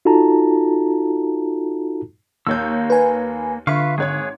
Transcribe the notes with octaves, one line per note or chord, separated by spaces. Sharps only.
D#4 F4 F#4 A4 A5 A#5
D#2 A#3 C#5 E6 G6
B4 G#5
D3 F4 B4 E5 F5 C#6
G#1 G#4 C#5 F#6 G#6